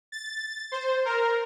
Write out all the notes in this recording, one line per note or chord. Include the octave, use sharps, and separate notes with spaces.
A6
C5
A#4